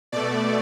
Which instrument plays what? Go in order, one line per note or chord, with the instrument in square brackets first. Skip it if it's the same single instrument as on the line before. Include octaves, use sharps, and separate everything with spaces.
[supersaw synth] B2 A3 D5